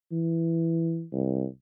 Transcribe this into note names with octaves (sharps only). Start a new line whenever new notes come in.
E3
C2